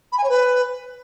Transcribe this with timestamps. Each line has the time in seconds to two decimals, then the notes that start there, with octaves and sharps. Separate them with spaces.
0.12 B5
0.18 G#5
0.23 C#5
0.29 B4